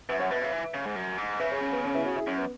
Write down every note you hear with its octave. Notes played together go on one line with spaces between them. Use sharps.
F#2 B4 E5
C#5 F#5
B2 B4 E5
C#3 B4 E5
E3
C#3
G#2
F#2
G#2
C#3 B4 E5
G#4 C#5
C#4
B3
C#4
B3 E4
C#4 F#4
E4 G#4
F#2 C#4
B3